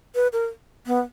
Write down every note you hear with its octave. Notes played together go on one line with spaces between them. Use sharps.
B4
A#4
B3